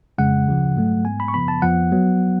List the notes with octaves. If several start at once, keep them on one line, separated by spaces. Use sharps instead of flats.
F2 C#3 G#3 F#5
D2 C#3 F3
G#2 F#3 A3
G#2 G#3 B3 G#5
B5
C#6
F#2 C#3 F3 B3 B5
A5
F2 F3 B3 F#5
F#3 B3